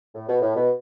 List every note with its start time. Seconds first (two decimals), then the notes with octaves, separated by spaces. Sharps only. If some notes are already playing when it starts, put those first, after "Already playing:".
0.15 A2
0.29 B2
0.42 A2
0.56 B2